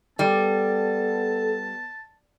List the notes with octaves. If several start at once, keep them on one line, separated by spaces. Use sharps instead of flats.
G3 B3 A4 A5